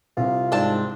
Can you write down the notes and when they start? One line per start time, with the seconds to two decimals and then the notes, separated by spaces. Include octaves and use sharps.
0.17 C2 F4
0.52 G#2 C4 D4 A5